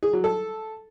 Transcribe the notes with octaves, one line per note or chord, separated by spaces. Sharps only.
G#4
F#3
A4